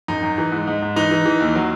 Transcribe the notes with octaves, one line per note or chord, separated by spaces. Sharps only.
F#2 D#4
F#2
E3
G#2
G#2
G#2
E3 D#4
E3
E3
D#2
F#3